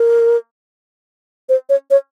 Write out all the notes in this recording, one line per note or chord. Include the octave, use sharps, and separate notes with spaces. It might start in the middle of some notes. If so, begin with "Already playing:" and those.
Already playing: A#4
C5
C#5
C#5